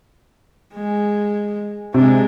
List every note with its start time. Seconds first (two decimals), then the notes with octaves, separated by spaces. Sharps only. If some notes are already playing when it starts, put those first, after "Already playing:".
0.74 G#3
1.94 C3 G#3 D4